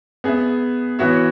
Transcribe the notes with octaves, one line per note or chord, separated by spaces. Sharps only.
B3 G#4 E5
E3 B3 F#4 C#5 E5